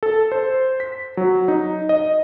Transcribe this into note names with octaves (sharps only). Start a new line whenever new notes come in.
A4
C5
B6
F#3
D#4
D#5